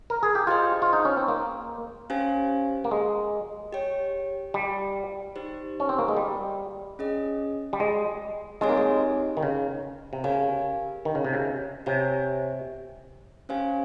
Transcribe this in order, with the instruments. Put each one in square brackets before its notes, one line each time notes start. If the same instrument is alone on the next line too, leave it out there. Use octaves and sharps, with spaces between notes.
[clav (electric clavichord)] A#4
G#4
G4
[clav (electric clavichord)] F4 [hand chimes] G#4 C5 D#5 G5
[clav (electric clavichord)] F4
D#4
C#4
C4
A#3
[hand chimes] C#4 G4 C5 F5 G#5
[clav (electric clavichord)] A#3
G#3
[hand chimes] G4 C#5 G5
[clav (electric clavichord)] G3
[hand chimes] D#4 G4 C5
[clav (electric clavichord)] C#4
C4
A#3
G#3
G3
[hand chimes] C#4 G#4 D#5
[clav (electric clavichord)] G3
G#3
[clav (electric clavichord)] G#3 [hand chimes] C4 D#4 G4 C#5 G#5
[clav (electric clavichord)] A#3
G#3
D#3
C#3
C3
[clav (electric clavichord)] C#3 [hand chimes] G4 A#4 F5 G#5
[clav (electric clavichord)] D#3
C#3
C3
C#3
[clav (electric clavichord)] C3 [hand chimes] G4 C#5 G#5
[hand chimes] C#4 G4 C5 F5 G#5